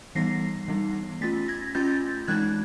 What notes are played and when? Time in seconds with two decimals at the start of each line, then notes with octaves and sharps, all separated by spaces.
0.15 E3 G3 B3 D#4 A#6 C7
0.68 E3 G3 B3 D#4
1.21 A3 C#4 F4 A6 B6
1.48 G#6 A#6
1.75 A3 C#4 F4 G6 A6
2.28 E3 G#3 C4 D#4 F#6 G#6